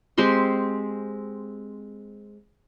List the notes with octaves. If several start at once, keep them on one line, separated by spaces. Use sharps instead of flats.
G#3 C4 G4 C6